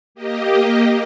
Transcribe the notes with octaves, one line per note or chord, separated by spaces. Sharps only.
A#3 G4 D#5